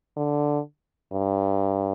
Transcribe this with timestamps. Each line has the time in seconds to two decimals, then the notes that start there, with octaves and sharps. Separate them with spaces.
0.17 D3
1.12 G2